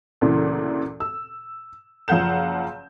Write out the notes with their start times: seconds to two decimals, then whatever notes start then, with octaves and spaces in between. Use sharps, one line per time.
0.21 D2 A#2 C#3 E3
1.00 E6
2.08 F#1 F3 F5 F#5 G6 E7